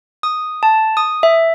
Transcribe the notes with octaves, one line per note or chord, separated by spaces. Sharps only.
D#6
A5
D#6
E5